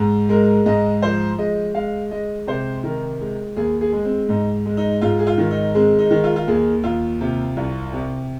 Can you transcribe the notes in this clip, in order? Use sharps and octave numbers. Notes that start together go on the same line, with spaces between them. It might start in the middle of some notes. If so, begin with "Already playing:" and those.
Already playing: G#2
G#3 A#4
G#2 D#5
F3 C5
G#3 D#5
G#3 F5
G#3 D#5
C3 C5
D#3 A#4
G#3
D#2 G#4
G#4
G#3
C4
G#2 D#4
G#3
D#4
G#2 F4
G#4
F4
D#3
D#4
G#3 C4
D#4
D#3
F4
F4
D#2 G#4
D#2 F4
C3
C2
C3